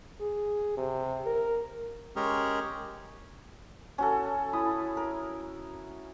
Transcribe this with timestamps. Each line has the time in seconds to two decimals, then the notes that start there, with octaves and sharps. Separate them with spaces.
0.20 G#4
0.77 C3
1.26 A#4
2.16 G#3 C#4 G4 G#4 A#4
3.98 C#4 F#4 A4
4.53 E4 B5 D#6
4.97 A#4